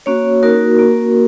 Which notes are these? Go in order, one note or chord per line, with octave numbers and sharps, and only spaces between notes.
A#3 C#4 F#4 C#5
A#3 D#4 F#4 A#4
A#3 C#4 F#4